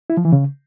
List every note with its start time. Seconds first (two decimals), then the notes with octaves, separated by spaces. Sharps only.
0.10 E4
0.17 F3
0.25 E3
0.33 C#3